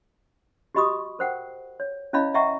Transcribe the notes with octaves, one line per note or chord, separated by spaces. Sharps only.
F#4 G4 D#5 B5 C#6 D#6
A#4 C5 F#5 G5
C#5
C#4 E4 C#5 D#5 F5 B5
D#5 E5 F#5 G5 A#5 C#6